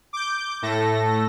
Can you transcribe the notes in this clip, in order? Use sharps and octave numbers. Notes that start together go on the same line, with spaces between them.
D6 G6
A2 A3 A4 A#6